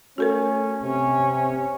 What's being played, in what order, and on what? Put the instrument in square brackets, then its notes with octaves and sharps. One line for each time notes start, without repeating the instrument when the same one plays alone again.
[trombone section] A3 C#4 [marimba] F#4 A4 A#4
[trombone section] C3 [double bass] C#4